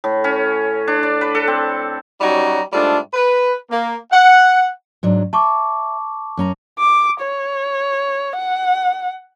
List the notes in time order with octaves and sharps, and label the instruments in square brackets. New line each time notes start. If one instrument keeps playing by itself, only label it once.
[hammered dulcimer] A2
C#4
D4
D5
B4
A4
C4
[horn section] F#3 G3 C#4 D#4 F#4 A#5
G#2 G3 A3 D4 F4 A4
B4
A#3
F#5
[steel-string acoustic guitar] G#2 F#3 D4
[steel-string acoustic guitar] E5 [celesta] A5 C#6 D6
[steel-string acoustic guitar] F#2 C#4 A#5
[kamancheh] D6
C#5
F#5